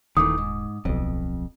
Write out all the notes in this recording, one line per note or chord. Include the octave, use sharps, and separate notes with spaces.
D#1 D#3 E3 A3 D6 D#6
G#2
D1 B1 F2